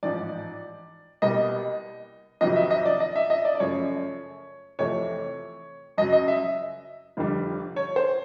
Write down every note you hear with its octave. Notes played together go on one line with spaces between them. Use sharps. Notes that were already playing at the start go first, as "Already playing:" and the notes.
A1 G#2 F3 D5
C2 B2 G3 A#3 D#5
F1 F2 C3 D#3 F#3 D#5
E5
D#5
D5
D#5
E5
D#5
D5
D5
F#2 C#3 F3 A3 C#5
F2 C3 E3 A3 C#5
F#2 C#3 F#3 D#5
D#5
E5
F1 F2 D3 G3
C#5
C5